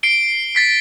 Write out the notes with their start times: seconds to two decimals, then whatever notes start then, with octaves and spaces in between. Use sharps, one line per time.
0.03 C7 D7 G7
0.55 A6 B6 C7